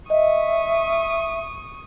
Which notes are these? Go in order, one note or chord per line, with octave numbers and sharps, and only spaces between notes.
D#5 E5 C#6 D#6